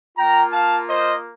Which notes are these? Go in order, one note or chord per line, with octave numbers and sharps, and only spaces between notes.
A#3 F4 G5 A#5
F5 A5
C5 D#5